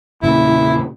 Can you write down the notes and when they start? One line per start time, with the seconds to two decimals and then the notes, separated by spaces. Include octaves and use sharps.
0.22 E2 A#2 C#3 E4